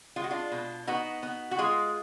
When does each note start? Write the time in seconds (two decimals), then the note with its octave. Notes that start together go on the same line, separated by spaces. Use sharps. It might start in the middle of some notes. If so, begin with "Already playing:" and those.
0.16 G#3 F4
0.24 F#4
0.31 D4 F4
0.52 B2
0.87 B3 D#4 F#4
1.23 B3
1.51 F#4
1.58 G#3 F4 G#4